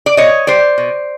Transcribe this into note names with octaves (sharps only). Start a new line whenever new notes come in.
D5
B2 C#5 D#5
G3 C5 D5
B2